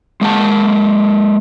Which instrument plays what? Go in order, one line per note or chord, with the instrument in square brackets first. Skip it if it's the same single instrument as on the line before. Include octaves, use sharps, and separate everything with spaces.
[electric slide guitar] G#3 A#3 F#5 A5